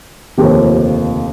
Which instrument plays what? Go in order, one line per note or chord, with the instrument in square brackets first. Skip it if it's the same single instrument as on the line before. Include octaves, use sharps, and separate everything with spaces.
[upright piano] F1 D#2 D3 F3 G4